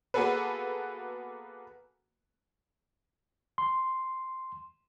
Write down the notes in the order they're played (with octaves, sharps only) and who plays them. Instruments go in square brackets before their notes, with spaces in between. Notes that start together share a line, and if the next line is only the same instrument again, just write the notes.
[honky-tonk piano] A#3 B3 F#4 G#4 A4 B4
[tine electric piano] C6